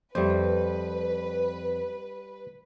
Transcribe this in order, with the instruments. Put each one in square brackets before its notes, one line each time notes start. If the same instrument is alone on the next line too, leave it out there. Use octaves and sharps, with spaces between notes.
[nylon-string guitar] F2 A3 [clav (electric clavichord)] G3 C5 [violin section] B4